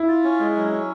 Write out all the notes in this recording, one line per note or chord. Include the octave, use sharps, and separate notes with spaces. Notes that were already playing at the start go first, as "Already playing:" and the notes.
Already playing: E4
F4
C#4
G#3
F#3
C#4